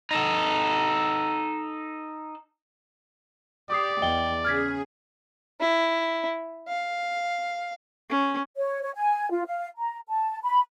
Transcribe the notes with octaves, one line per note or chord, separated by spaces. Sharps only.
D#4 A4
G4 D5 D6 D#6 C7
E2 D#5 G5 G7
C#3 G#4 F6 G#6 B6
E4
F5
C#4
C#5
C#5
G#5
F4
F5
A#5
A5
B5